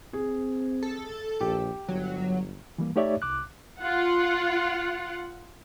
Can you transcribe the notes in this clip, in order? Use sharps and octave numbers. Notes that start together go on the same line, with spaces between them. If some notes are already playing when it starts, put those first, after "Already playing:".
C4 G#4
A4
A#1 G4
G1 F#3
E3 G3 A#3
A3 D#4 G4 C#5 D5 E5
C2 D6 F#6
F4 F#5